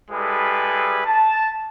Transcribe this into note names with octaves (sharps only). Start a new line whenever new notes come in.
G3 G#3 E4 G#4 A4 B4
A5